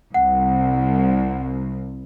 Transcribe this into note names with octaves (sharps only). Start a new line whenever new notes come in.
C2 F#5